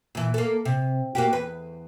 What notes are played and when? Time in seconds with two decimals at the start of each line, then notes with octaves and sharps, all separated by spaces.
0.15 A#2 E3
0.34 A#3 A4
0.65 C3
1.15 A#3 F#4 G4
1.33 E2 B4